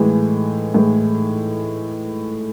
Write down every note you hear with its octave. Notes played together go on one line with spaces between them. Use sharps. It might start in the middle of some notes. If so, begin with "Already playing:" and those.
Already playing: A2 E3 G#3
A2 E3 G#3